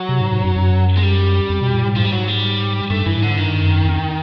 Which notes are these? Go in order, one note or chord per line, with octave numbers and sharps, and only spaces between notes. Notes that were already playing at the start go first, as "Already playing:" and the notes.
Already playing: F#3
C3
G#2
G#2
F#2
F#2
G#3
G3
F2
B2
A#2
A2
G#2 F3
G3
F#3
G3
G2 A3
G2 E3
A2
G#2 D3
G2 D#3
F#2
F2